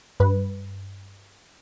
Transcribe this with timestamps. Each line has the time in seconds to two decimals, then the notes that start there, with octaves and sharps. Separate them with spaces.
0.20 G2 B4